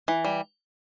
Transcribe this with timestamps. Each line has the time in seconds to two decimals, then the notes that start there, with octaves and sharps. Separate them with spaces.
0.08 E3
0.25 G3